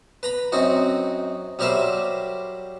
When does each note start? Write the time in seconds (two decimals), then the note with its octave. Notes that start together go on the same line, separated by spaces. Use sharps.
0.23 B4 A#5 B5
0.52 F#2 C4 D#4 F#4
1.59 F#3 G3 G4 A#4 C5 E5